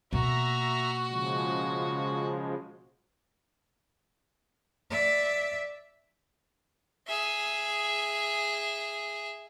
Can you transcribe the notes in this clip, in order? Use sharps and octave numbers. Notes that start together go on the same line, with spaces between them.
B2 A#3 F#4 E5 A#5
C#3 F3 G#3
D5 E5
G#4 E5